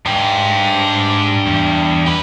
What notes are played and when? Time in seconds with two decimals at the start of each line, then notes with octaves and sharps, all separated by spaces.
0.06 G#2 D4 G4
1.47 E2
2.06 G4 B4